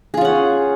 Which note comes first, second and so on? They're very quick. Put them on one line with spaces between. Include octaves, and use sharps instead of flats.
G#4 F4 C#4 F#5